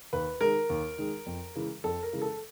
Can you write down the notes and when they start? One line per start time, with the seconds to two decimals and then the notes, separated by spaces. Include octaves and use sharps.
0.13 D#2 B4
0.41 D#3 G#3 A#4
0.70 D#2
0.98 D#3 G#3
1.26 F2
1.55 C#3 E3 G#3
1.84 F2 A4
2.03 A#4
2.13 C#3 E3 G#3
2.22 A4